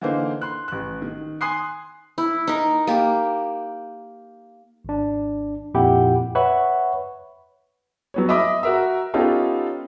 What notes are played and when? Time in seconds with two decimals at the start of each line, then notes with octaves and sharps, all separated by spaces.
0.01 D3 E3 A#3 D#4 C5
0.41 C6 F#6
0.68 A1 F#6
1.02 D#3
1.41 G#5 C6 D#6 F#6 C7
2.18 E4
2.47 D#4 A#4
2.87 A#3 G4
4.85 G#1 D4
5.74 F2 A#2 E4 G4 F#5 G5
6.35 B4 C#5 E5 F#5 B5 C#6
8.14 F#3 B3 C#5
8.29 D#5 E5 B5 D6 D#6
8.63 F#4 A#4 E5
9.14 B3 C#4 D#4 F4 G4 A4